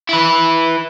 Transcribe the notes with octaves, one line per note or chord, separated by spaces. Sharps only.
E4 B4